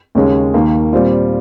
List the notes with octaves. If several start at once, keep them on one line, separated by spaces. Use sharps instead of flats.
D#2 C#3 G#3 C#4
D#2 D#3 A#3
A#2 G3 C4 F4